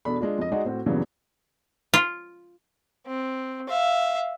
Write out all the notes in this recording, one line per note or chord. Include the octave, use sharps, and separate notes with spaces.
E2 B2 D4 A4 B5
G#3 D4 F4
F2 D#5
G#3 D#4 F#4 G#4 D5 D#5
A2 C4 F#4
E2 G2 A#2 C#3 E3 F#3
F4
C4
E5 F5